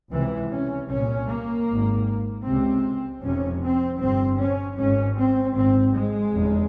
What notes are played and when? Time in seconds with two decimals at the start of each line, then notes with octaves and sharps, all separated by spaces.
0.11 C#2 C3 E3
0.51 C#4
0.89 C2 A#2 C#4
1.28 A#3
1.67 G#1 G#2
2.44 C#2 C3 C4
3.21 F1 F2 C3 C#4
3.61 C4
3.99 G1 G2 C4
4.38 C#4
4.77 G#1 G#2 C#4
5.16 C4
5.54 G#1 G#2 C4
5.94 G#3
6.32 F1 E2 C#3